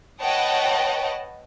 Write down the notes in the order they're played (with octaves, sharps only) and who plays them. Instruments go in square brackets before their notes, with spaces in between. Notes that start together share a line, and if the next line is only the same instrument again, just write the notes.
[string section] B4 C#5 D#5 F#5 G5 A5